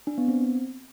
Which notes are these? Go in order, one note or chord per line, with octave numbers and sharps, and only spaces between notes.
D4
B3
C4